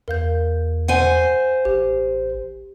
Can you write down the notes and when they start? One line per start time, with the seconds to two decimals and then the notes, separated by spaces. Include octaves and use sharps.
0.08 E2 A#4 F5 G6
0.88 C5 F#5 G#5
1.65 A1 G4